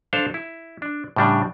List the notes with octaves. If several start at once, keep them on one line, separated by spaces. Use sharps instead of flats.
D4 A4 C5 F5
E4
D4
A2 C#3 G3 D4